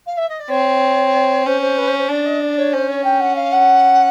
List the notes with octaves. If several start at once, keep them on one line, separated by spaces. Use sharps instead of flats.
F5
E5
D#5
D5
C4 C#5
C#4 C5
C5
B4
C5
C5
D4 D5
D#5
D5
C#5
C#4 C5
C#5
G5
F#5
F5
F#5